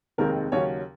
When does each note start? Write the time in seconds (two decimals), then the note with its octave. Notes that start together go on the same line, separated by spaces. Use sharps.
0.18 F1 D#2 D#3 G#3 C4 A#4
0.52 D#2 C#3 F#3 C#4 C#5